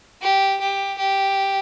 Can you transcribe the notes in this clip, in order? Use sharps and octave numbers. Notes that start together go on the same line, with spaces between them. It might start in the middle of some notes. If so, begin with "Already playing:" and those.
G4
G4
G4